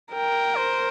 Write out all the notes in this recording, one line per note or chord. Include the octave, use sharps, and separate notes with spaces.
A#4 G5
C5